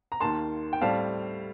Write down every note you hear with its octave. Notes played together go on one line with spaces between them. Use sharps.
A#5
D#2 D#3 A#3 A5 C6
G5
A2 G3 C4 F5 A5